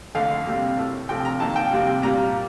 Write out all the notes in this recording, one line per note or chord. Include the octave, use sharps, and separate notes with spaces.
F2 D3 A3 F5
C3 G3 A#3
A2 A3
C3 F3 A3 G5
A#5
F2 D#3 A#3 A5
G5
F2 C3 G3 A#3
A#2 G3 A#3 A#5